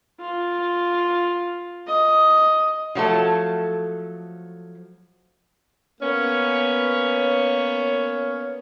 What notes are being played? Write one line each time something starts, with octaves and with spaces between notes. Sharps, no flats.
F4
D#5
F3 F#3 A3 A4
A#3 B3 C#4 C#5